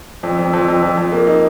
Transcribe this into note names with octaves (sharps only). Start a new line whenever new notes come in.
F2
F2
F2
F2
F2
F2
A#3
D#4